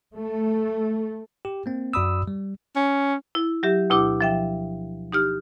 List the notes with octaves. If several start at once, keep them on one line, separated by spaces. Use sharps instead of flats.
A3
G4
A#3 C4
F#2 F#4 D5 B5 D#6 E6
G3
C#4
E4
F#3 G4 E5
D2 B2 E4 G4 D6
F3 E5 G5
D#4 G4 F6